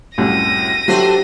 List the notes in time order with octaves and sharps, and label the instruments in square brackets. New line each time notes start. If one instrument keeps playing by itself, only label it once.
[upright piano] C2 F#2 A2 [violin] A#6 D#7
[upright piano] F#3 [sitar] A3 D4 C5 [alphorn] G4